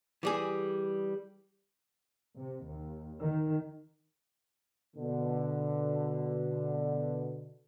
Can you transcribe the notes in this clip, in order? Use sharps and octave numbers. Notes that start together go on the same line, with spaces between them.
E3 G3 G#4
C3
D#2
D#3
B2 D3